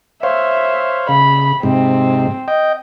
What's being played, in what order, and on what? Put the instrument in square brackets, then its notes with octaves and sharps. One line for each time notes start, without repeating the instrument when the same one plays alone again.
[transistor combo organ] C5 C#5 F5 [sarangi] E5
[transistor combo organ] C#3 [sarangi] B5
[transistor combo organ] G#2 C3 [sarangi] C4
[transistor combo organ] D#5 G5